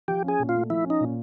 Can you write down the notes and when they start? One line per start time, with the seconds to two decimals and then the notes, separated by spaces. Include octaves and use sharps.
0.08 F3 G4
0.24 C#4 G#4
0.39 A#2
0.49 F4
0.55 A3
0.69 F3 E4
0.85 C#4
0.90 D#4
1.00 A#2